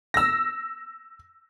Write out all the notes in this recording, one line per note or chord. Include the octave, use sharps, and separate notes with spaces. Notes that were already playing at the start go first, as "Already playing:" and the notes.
E6 A#6